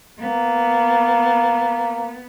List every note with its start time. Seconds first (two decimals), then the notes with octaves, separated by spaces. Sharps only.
0.19 A#3 B3